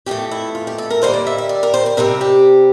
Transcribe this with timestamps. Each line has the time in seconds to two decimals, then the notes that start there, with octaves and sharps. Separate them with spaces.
0.06 F2 E3 A3 G4
0.31 E4
0.55 F4
0.67 G4
0.78 A4
0.90 A#4
1.02 D3 G3 A#3 C5
1.14 D5
1.27 E5
1.38 E5
1.49 D5
1.63 A#4
1.74 C5
1.86 C5
1.97 C3 G3 C4 A#4
2.21 G4